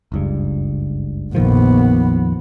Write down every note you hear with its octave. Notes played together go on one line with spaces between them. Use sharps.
F#1 C#2 G2
A#1 F2 D#3 F3 B3